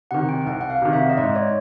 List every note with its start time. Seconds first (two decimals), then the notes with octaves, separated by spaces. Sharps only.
0.11 C3 D#3 F#5
0.29 G5
0.46 C2 F#5
0.61 F#5
0.70 F5
0.82 C3 D#3
0.93 E5
1.10 D#5
1.17 G#2 D5
1.35 C#5